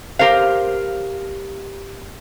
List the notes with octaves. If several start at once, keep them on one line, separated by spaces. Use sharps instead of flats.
G4 A#4 C5 F5